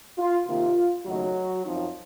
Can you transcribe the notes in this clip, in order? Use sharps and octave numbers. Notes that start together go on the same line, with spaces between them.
F4
C3 D#3 A#3 F4
D#2 C#3 F#3 A3 D#4 F#4
F#2 F3 C4 D#4